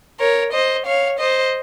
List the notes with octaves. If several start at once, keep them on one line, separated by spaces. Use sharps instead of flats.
A#4 C#5
C5 D#5
C#5 F5
C5 D#5